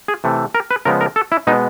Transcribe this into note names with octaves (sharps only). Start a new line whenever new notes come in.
G#4
C3 E3 A3
A#4
B4
C#3 F3 G#3 B3 A#4
A#4
A4
E4
B2 G#3 B3 D#4